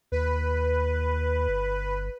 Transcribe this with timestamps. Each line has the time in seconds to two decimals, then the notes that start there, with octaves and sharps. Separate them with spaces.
0.12 D#2 B4
1.48 G1